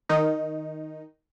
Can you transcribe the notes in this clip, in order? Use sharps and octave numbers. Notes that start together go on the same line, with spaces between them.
D#3 D#4